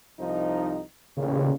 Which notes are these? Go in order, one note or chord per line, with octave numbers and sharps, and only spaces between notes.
C2 F3 D#4
A1 D#2 A#2 C#3